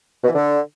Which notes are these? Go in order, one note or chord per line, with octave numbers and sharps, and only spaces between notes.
B2
E3
D3